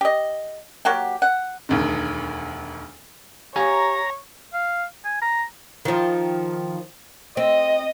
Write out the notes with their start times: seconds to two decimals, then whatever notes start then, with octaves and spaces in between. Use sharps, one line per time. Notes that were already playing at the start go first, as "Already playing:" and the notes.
0.01 G4 D#5
0.85 F#3 A#3 F#4 G4
1.22 F#5
1.69 E1 D2 D#3
3.56 G4 C#5 F5 G#5 A#5
4.53 F5
5.05 G#5
5.22 A#5
5.85 D#3 F3
7.37 C4 D#5